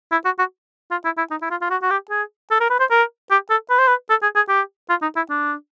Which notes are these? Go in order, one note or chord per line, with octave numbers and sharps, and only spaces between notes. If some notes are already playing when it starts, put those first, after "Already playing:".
E4
F#4
F#4
F4
E4
E4
D#4
E4
F4
F4
F#4
F#4
G4
G#4
A4
A#4
B4
C5
A#4
G4
A4
B4
C5
B4
A4
G#4
G#4
G4
F4
D#4
E4
D4